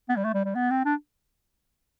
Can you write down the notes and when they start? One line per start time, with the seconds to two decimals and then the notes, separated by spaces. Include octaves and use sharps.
0.09 B3
0.16 G3
0.24 A3
0.34 G3
0.45 G3
0.55 B3
0.70 C4
0.85 D4